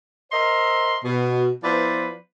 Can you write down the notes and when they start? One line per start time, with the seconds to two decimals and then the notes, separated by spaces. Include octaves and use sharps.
0.32 A#4 C5 D#5 E5 C6
1.04 B2
1.64 F3 B3 E4 B4 C5 D5